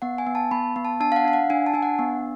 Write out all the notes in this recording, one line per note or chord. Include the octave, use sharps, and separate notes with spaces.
B3 F#5
G#5
B3
A5
B3 B5
B3
A5
D4 A5
F5
F#5
D4 F5
F#5
D4 G#5
A5
D4 G#5
F#5
B3